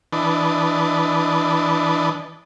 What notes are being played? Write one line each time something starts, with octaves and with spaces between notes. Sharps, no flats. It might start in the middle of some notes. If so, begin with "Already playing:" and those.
E3 D4 B4 D#5 A5